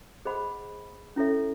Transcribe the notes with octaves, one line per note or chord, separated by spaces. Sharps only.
G#4 C5 D#5 F#5 B5
C#4 E4 A4 C#5 E5